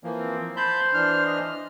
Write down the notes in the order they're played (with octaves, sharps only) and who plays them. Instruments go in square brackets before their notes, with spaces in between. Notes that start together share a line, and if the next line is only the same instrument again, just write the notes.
[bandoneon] E3 F3 A#3
[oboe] C4
[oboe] C5 [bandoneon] A5 B5 G6
[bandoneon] E3 D4 F6
[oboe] D#5